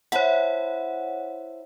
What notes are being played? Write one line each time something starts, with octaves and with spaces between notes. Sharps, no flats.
E4 C5 C#5 F#5 A5